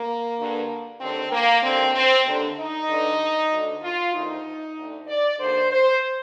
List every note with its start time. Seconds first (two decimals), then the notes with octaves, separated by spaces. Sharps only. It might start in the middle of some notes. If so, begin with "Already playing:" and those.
Already playing: A#3
0.39 G2 D3
1.01 D#2 D3 C4
1.32 A#3
1.63 D#2 D3 C4
1.95 C4
2.25 D#2 D3
2.58 D#4
2.89 G2 D3
3.51 D2 D3
3.82 F4
4.14 D2 C3 D#3 D#4
4.77 D2 D3
5.07 D5
5.39 D#2 D3 C5
5.71 C5